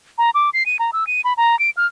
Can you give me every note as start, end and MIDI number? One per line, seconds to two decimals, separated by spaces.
0.18 0.30 82
0.34 0.50 86
0.53 0.66 96
0.66 0.77 99
0.79 0.91 82
0.93 1.07 88
1.07 1.21 99
1.24 1.33 83
1.37 1.58 82
1.59 1.70 98
1.77 1.87 89